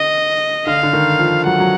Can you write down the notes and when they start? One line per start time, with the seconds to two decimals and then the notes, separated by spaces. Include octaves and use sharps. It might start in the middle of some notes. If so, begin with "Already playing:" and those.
Already playing: D3 D#5
0.66 D3 F5
0.83 D3
0.93 D#3
1.19 F3
1.46 F#3 F#5
1.60 F#3